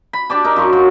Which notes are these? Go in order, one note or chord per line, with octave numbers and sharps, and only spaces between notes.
B5
D4 G4 D5 A5
D#4 A#4
F#2 F4 C#6
F#3